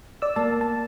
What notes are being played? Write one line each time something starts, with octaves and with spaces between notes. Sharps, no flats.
D5 E6
A#3 A5
A5